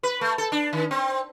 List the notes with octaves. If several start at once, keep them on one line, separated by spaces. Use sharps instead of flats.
B4
A3
A4
D4
D#3
C4